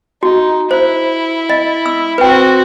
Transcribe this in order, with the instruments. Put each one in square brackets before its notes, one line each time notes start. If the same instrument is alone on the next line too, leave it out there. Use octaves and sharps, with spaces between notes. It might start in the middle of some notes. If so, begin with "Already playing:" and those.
[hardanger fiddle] D#4 [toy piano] F#4
[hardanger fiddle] E4 [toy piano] C5
[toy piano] D#5
E6
[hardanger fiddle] C4 F#4 [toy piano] B4 G5